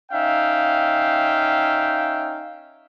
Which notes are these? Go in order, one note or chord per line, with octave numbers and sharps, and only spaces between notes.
C#4 D#4 E5 F5 G5